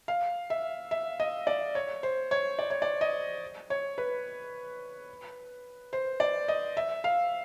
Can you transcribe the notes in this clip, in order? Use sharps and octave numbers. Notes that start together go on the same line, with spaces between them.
F5
E5
E5
D#5
D5
C#5
C5
C#5
D5
C#5
D5
D#5
C#5
B4
C5
D5
D#5
E5
F5